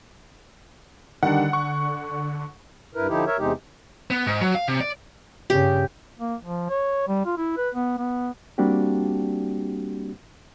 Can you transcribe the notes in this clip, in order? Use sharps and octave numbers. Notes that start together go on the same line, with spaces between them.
D3 D#3 G3 D4 F#5
C#6
G2 E4 A#4 B4
D3 F3 D#4 E4 G4
A#4 C#5 E5
E2 C3 G#3 D#4 G4
B3
G#2
F#3
F5
C3
D5
G2 C#3 G4
A#3
F3
C#5
G3
F4
E4
B4
B3
B3
G3 A#3 C4 D4 F#4 G4